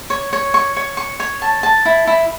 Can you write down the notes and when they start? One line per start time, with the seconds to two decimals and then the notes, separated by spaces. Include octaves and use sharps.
0.10 C#5
0.33 C#5
0.54 C#6
0.76 C#5
0.97 C#6
1.20 C#5
1.42 A5
1.63 A5
1.85 E4
2.07 E4